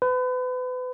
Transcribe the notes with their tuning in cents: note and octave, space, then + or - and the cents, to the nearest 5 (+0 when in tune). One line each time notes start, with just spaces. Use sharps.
B4 +35